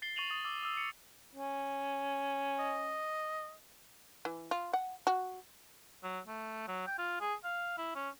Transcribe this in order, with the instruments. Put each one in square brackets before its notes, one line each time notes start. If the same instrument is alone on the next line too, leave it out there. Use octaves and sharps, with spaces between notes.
[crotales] A6 C7 G7
C#6 A6 D#7 F7 F#7
D#6 A6
D6 E6
D#6 E6
C#7
[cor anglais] C#4
[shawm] D#5
[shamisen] E3
F4
F#5
F#4
[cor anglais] F#3
A3
F#3
G5
F4
G#4
F5
E4
C#4